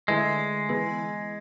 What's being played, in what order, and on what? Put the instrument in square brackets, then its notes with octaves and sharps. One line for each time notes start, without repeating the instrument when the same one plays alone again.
[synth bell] D3 A3 E4 B4 E5 [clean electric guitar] G#3
[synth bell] E3 B3 E4 G#4 B4